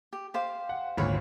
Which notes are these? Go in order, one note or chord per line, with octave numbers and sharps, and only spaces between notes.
G4
G4 C5 F5
F#5
G#1 D2 A#2 B4 C#5 B5